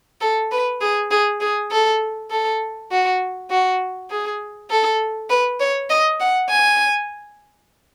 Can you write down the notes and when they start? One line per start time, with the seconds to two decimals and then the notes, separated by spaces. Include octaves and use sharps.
0.21 A4
0.52 B4
0.81 G#4
1.11 G#4
1.41 G#4
1.71 A4
2.31 A4
2.91 F#4
3.50 F#4
4.10 G#4
4.70 A4
5.30 B4
5.60 C#5
5.90 D#5
6.20 F#5
6.49 G#5